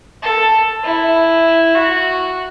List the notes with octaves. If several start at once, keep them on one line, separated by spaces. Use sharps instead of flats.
A4
E4
F#4